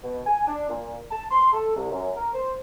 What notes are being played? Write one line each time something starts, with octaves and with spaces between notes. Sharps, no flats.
B2
G#5
D4
A#2
A5
C6
A4
C2
F#2
A#4
C5